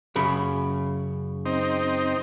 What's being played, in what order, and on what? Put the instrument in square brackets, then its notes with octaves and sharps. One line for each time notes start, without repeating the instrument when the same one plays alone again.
[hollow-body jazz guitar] F#2 C#3 B5
[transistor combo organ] C4 D#4